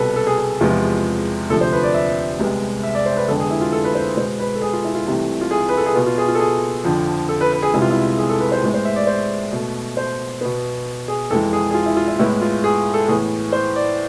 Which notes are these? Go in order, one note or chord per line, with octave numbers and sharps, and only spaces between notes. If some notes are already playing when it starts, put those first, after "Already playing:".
Already playing: C2 B2 B3 A4 B4
A4
G#4
G#4
E2 C3 F3 G#3 B3 F4
D2 C3 F3 A4
C5
B4
D5
E5
C2 C3 G#3 B3
E5
D5
C5
B4
F2 D3 G#3 B3 A4
G#4
E4
F4
A4
B4
C5
B2 G#3 B3 C5
B4
A4
G#4
F4
E4
F4
C2 C3 E3 A3
F4
G#4
B4
A4
G#4
B2 B3 F4
F4
G#4
F4
A4
G#4
F2 D3 F3
A4
B4
B4
G#4
C2 C3 G#3 B3 E4
F4
E4
G#4
A4
B4
C5
A2 G#3 B3
C5
E5
D5
C5
B2 A3
C5
B2 B3 B4
G#4
F2 E3 G#3 A4
G#4
G#4
F4
E4
F4
E4
A2 G#3 B3 E4
F4
G#4
A4
A2 E3 B3 G#4
C5
D5